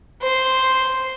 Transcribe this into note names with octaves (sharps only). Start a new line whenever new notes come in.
C5